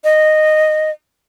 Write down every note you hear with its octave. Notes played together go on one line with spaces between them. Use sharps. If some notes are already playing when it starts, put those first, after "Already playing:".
D#5